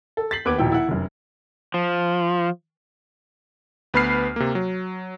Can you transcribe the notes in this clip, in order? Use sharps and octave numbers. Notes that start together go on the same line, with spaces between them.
A4
A6 B6 C7 F#7
D#2 B3 B4 D6 G#6 D7
D#1 B2 F3 E4 G5
E4 F#5
F1 F#2
F3
D2 B3 B4 B5 F6 C7
C3 A#3
F#3